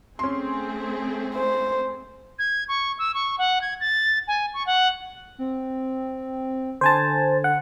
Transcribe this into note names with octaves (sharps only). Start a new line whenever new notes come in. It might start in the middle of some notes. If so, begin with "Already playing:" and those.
A3 C4 C#4 G#4 C6
C5
G#6
C#6
E6
C#6
F#5
G#6
A6
G#5
C#6
F#5
C4
D3 C5 G#5 A5
F#5